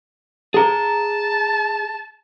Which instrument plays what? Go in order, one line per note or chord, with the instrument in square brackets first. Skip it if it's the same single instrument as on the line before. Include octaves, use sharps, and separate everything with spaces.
[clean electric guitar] G#4 A#5 [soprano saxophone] A5